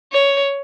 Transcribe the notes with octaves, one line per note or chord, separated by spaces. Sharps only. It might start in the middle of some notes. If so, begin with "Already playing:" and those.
C#5